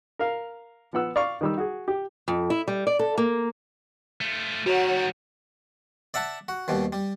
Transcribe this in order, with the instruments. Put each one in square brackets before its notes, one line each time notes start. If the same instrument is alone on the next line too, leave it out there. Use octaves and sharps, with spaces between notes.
[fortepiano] A#4 F5
F3 B3 F#5 E6
D5 F5 C#6
D#3 G3 E6
F#4 G#4
G4
[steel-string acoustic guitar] F2
E4
G3
D5
A4
A#3
[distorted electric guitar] A3 F4
[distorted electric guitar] D#3 G3 [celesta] F#4 [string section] C#5 F#5 A#5
[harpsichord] D5 E5 F#5 A5
F#4
D#2 B2 G3
G3